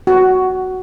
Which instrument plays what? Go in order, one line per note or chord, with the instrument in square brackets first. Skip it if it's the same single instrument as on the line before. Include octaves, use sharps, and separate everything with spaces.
[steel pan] F#4